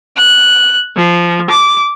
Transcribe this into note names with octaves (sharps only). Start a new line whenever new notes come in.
F#6
F3
D6